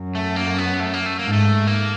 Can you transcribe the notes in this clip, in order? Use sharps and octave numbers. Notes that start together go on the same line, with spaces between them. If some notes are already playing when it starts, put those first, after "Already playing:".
Already playing: F#2
A3
A#3
B3
A3
A#3
A3
G#2 A#3
A3
A#3